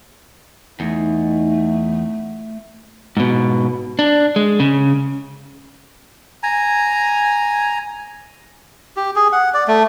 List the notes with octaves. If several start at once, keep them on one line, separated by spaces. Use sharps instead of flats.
E2 A3 D#4
G#2 B2
D4
G#3
C#3
G#5 A#5
G4
G#4
F#5
D5
A3